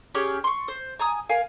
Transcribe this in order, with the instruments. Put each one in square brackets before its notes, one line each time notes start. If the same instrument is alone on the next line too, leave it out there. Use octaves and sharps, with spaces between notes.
[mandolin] C#4 G4 G#4 D5
C6 C#6
C5
G#5 A#5 D#6
A#4 F5 G#5